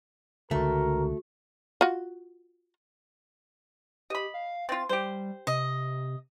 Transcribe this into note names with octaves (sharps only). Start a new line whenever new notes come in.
C#2 D3 A3 F#4 A#4
F4 F#4
G4 D#5 B5
F5
C4 F4 A6
G3 G4 C5
C3 D#5